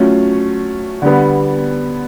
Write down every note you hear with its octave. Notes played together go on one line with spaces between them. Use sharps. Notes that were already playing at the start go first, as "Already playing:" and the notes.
Already playing: F#3 A3 C#4 F4
D3 G3 B3